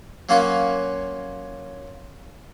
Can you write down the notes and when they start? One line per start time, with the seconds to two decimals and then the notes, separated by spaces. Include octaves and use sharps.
0.29 F#3 A#3 C#4 F4 F#4 C#5